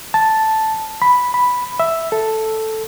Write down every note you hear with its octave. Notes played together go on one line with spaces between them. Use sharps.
A5
B5
B5
E5
A4